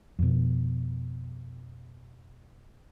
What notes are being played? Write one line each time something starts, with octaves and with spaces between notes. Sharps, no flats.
F2 B2